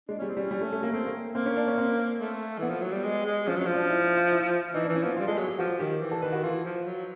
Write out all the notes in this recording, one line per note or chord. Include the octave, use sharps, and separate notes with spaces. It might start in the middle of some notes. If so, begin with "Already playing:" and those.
G#3 D4
G3 C#4
C4
G3 C#4
G3
A3
A3
A#3
A3 C4
A#3
A#3 C4
C#4
D4
C#4
C4
A3
E3 B3
F3
F#3
G3
G#3
G#3
F3 C#4
F#3
C#4
F3
D4
E4
E4
F4
E4
E3 D#4
D4
E3
C#4
F3 B3
F4
G3
G#3 A4
F#3 G#4
G4
F3 F#4
D#3 G4
E3
A4
D#3 B4
F#4
E3 F4
F3
F#3